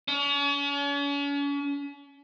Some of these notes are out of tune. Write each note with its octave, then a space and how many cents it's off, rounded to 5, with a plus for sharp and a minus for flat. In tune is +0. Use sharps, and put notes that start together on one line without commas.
C#4 +40